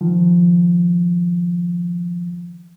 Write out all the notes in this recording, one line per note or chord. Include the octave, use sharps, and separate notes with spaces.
D#3 F3